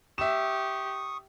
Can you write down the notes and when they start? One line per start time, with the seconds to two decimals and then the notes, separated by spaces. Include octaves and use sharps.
0.18 G4 E5 C#6 D#6 E7